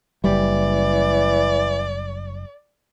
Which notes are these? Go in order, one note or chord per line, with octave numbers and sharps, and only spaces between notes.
F#1 E3 G3 D5